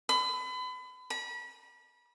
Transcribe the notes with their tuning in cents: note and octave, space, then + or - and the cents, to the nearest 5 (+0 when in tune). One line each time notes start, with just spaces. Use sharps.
B5 +35
B5 -35